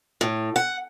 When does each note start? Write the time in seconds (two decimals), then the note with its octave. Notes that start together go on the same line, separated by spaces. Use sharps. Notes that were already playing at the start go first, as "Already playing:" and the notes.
0.21 A2
0.56 F#5